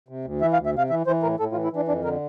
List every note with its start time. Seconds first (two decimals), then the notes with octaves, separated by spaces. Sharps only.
0.09 C3
0.25 D2
0.41 E3 E5
0.53 F5
0.58 D2
0.66 E5
0.74 C3 F5
0.90 E3 E5
1.07 E3 C5
1.23 A2 A#4
1.39 A2 A4
1.52 F4
1.55 E3
1.64 E4
1.72 E3 D4
1.88 F2 D4
2.04 D3 A#4